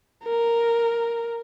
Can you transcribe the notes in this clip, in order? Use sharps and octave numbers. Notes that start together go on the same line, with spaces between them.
A#4